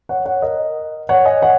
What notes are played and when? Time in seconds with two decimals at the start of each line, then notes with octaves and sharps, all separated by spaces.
0.09 C#5 F#5
0.25 C#5 F#5
0.42 A#4 D#5
1.09 C#5 F#5
1.25 D#5 G#5
1.42 C#5 F#5